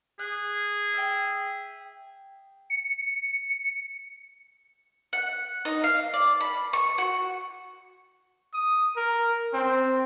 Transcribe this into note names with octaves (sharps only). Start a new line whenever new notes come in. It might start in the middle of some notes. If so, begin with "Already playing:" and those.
G#4 F#6
E5 G5
C#7
F#5
D#4
F5
D5
B5
C#6
F#4
D#6
A#4
C4